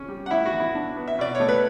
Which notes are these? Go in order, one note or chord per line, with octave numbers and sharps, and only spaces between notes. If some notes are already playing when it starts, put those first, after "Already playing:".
Already playing: C#3 C#4
G3
F#5
A2 E4 E5
F#4
E3
E4
D4
B3
E5
B2 D5
C#5
A3
B4